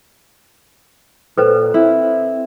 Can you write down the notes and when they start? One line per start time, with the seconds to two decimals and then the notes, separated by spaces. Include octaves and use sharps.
1.38 A#2 A4 B4 C5
1.74 C4 E4